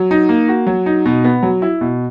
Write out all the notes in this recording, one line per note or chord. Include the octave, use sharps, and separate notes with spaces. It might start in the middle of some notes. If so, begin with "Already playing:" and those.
Already playing: F#3
D#4
A#3
F#4
F#3
D#4
B2
B3
F#3
E4
B2